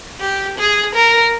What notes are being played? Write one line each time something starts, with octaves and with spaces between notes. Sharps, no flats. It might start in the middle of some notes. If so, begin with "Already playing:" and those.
G4
G#4
A#4